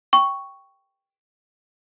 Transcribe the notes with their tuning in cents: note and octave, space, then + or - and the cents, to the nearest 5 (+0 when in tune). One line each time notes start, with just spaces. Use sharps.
G5 +0 C#6 +0